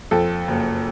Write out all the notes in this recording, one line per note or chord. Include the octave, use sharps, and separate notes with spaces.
F2 A4
F#1